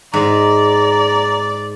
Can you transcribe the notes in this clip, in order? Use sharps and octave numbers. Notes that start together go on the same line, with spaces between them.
G#2 D5 A#5